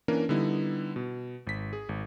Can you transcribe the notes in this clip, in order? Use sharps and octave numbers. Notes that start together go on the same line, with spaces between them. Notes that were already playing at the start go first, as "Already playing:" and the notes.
E3 A#3 C#4 D4 A#4
D3 G3 B3 D#4 E4
B2
G#1 B6
G#4
G#1